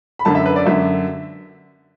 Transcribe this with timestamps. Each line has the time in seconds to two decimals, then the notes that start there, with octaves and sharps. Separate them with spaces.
0.19 B5
0.25 F#2 D3 A5
0.35 E5
0.46 B4
0.56 D5
0.66 F#2 D3 E5